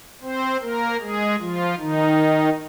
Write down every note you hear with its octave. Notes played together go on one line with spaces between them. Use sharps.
C4 C5
A#3 A#4
G#3 G#4
F3 F4
D#3 D#4